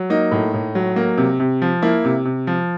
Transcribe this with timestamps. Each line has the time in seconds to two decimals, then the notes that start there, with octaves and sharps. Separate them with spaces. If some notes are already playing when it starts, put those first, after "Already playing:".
Already playing: F#3
0.10 A#3 D#4
0.32 A2
0.54 A2
0.75 F#3
0.96 A#3
1.18 C3
1.40 C3
1.62 F3
1.82 A#3 E4
2.05 C3
2.25 C3
2.47 F3